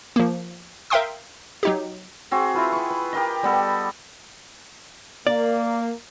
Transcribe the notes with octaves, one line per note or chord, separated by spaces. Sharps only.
F3 A#3
A#4 E5 F5 G5 C6 D#6
F#3 D#4 G4
C4 F#4 G#4
E4 F4 B4
B4 C#6
B4
G4 A#4 D#5
G3 B3 A4
A#3 D5